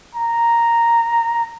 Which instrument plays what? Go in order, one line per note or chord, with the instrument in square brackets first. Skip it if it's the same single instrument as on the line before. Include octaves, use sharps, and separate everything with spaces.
[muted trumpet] A#5